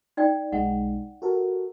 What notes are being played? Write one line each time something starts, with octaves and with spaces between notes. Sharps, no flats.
D#4 D5 G5
B1 G#3 D#4 F#5
F#4 A4 A#4